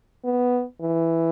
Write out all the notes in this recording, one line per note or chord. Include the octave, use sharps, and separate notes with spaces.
B3
E3